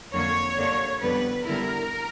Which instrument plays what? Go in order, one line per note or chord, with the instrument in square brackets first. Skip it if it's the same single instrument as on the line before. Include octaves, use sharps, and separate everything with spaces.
[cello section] F2 D3 F#3 A#3 C#5
F#2 D3 G3 A#3 D4
F2 D3 G3 B3 B4
D3 G3 B3 E4 A#4